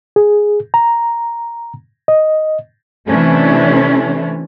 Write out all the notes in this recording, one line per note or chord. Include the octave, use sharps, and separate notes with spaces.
G#4
A#5
D#5
C3 E3 A3 C#4 D4